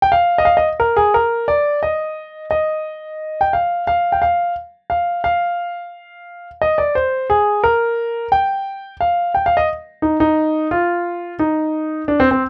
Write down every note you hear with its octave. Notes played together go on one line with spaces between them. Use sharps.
G5
F5
D#5
F5
D#5
A#4
G#4
A#4
D5
D#5
D#5
G5
F5
F5
G5
F5
F5
F5
D#5
D5
C5
G#4
A#4
G5
F5
G5
F5
D#5
D#4
D#4
F4
D#4
D4
C4
C4